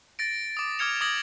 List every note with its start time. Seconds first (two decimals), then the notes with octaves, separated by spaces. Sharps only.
0.19 A6 A#6 D7
0.57 D6 D#6
0.79 D6 D#6 F6 G#6 C#7 F7
1.01 D6 D#6 G#6 A#6 F#7